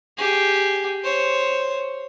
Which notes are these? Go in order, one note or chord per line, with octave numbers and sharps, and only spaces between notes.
G4 G#4
C5 C#5